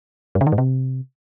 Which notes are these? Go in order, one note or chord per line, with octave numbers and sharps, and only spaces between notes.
G2
C#3
D#3
G#2
C3